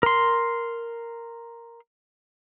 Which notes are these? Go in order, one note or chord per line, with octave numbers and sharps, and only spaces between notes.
A#4 C6